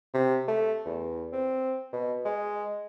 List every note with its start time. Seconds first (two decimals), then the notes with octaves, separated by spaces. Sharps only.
0.14 C3
0.48 A3
0.86 E2
1.32 C4
1.93 B2
2.25 G#3